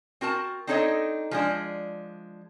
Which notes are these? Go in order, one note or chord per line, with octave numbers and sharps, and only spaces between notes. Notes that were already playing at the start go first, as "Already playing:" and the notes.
C4 F#4 A#4 A5
C4 D4 D#4 A4 C#5 D#5
F3 G#3 D4